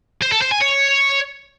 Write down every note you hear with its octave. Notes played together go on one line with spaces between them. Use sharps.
C5
A4
C5
G#5
C#5